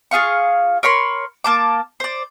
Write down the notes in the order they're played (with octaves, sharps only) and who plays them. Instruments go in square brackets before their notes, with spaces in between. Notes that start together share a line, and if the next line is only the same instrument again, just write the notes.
[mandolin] F4 G#4 F5 C#6
A#4 C#5 B5 C6
A#3 A5 D6
C5 D5